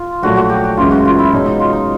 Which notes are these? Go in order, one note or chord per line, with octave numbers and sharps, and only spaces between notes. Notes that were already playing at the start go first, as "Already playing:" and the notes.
Already playing: F4
A#1 A#2 F#3 A3 F#4
F#4
G4
F#4
F#1 F#2 C#3 E3 G#3 F4
F#4
F4
E4
B2 G#3 C#4 D#4
D#4
F4
D#4